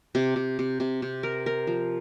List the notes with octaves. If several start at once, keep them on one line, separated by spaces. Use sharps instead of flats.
C3
C3
C3
C3
C3
A#4
A#4
F3